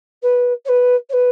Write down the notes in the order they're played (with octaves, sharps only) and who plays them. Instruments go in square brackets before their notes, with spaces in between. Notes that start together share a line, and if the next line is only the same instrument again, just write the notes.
[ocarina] B4
C#5
B4
C#5
B4